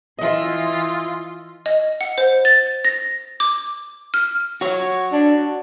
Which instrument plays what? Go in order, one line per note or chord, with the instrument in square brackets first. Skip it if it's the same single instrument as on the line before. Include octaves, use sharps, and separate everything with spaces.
[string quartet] E3 F4 [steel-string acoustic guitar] D#5 E5
[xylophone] D#5
F#5
C5
A6
A#6
D6
F6
[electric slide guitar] F#4 C#5
[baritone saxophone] D4